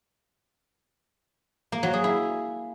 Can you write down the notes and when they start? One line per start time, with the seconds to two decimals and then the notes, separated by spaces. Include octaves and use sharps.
1.72 A#3
1.83 F#3
1.93 G#4
2.04 E4